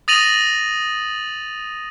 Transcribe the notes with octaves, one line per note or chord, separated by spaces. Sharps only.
D#6 A6 A#6 D#7 F7 F#7